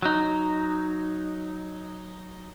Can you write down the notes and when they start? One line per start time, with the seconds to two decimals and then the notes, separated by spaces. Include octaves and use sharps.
0.02 F#3 D#4